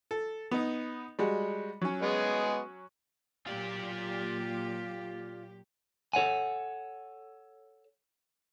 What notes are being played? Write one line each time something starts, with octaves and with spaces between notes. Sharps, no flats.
A4
B3 D#4
G3 G#3 F#4
F#3 C#4
G#3 B3 G#4
A#2 F#3 F4 G4 D5
A4 C#5 F#5 G#5